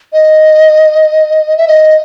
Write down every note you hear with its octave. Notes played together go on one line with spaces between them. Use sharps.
D#5
E5
D#5